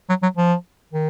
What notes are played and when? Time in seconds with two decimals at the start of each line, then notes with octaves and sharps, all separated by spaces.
0.09 F#3
0.23 F#3
0.37 F3
0.93 D#3